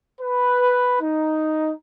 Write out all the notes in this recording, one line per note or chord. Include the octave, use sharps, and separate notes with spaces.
B4
D#4